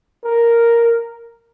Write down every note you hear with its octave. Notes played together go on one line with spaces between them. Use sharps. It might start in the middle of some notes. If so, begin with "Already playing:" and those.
A#4